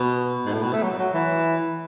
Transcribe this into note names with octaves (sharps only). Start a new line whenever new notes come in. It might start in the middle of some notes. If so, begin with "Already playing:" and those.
Already playing: B2
G#2
A2
B2
A3
F#3
F#3
E3